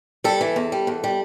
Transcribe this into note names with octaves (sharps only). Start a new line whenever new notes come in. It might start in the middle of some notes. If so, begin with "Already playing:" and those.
G3 A4
E3
E2
G3
E2
G3